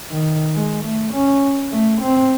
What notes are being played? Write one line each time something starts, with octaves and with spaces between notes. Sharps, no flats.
D#3
G#3
A3
C#4
A3
C4